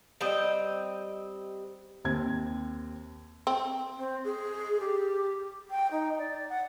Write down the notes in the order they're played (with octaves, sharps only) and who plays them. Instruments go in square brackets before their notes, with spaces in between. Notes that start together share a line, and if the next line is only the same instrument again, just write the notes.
[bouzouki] G3 C4 D#5
[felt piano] D#2 C4 G#6
[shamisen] C4
[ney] C4
G#4
G4
G5
D#4
D5
F#5